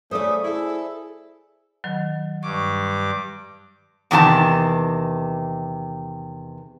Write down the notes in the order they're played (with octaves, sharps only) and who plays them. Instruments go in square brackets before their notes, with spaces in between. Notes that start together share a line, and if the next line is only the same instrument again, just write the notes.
[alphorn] C#3 [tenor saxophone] A3 [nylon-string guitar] C5 D5 [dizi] D#6
[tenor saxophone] E4 [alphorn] G#4 [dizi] A4
[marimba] D#3 F#3
[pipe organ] G2 D6 [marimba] C#6
[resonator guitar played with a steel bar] E2 C3 D#3 E4 A5